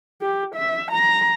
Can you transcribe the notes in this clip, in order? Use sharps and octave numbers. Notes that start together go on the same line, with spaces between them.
G4
E5
A#5